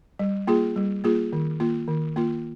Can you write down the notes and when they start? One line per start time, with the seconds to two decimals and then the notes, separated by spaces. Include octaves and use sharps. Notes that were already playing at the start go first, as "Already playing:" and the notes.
0.19 G3
0.47 A#3 F4 G#4
0.76 G3
1.04 A#3 F4 G#4
1.33 D#3
1.60 A#3 F4
1.88 D#3
2.16 A#3 F4